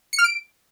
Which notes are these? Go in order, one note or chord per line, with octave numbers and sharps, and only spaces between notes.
C#7
F6
D7